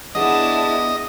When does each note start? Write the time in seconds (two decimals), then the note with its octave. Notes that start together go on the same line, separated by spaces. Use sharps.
0.15 B3 D4 E4 G#4 D5 D#5 A5